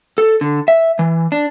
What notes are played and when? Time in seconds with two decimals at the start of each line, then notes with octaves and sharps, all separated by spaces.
0.18 A4
0.41 D3
0.68 E5
0.99 E3
1.32 D4